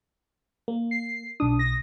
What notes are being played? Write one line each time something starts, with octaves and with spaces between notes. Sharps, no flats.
A#3
C7
B1 D4 D#6
A#6